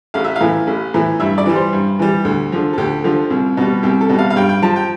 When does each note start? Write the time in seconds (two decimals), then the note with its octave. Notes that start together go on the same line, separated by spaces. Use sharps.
0.14 A1 F5
0.24 E5
0.36 F5
0.41 A2 E3
0.67 A1
0.94 A2 E3
1.20 G2 E5
1.38 D5
1.46 E3 G3
1.55 C5
1.73 G2
1.99 E3 G3
2.25 D2
2.52 D3 F3
2.73 A4
2.78 D2 G4
3.04 D3 F3
3.30 C2
3.57 B2 G3
3.83 C2 G4
4.01 A4
4.09 B2 G3
4.19 F5
4.30 F5
4.36 G2 G5
4.49 G5
4.62 F3 A5
4.76 G5